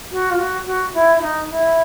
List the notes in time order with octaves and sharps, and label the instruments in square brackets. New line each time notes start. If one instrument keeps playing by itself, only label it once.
[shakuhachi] F#4
F4
F#4
F#4
E4
E4
D#4
E4